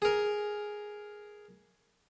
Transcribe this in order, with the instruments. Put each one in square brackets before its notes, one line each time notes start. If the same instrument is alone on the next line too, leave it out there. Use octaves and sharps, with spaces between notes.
[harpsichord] G#4 A#4